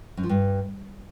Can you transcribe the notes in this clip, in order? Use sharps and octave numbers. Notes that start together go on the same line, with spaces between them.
F#2
F3
G2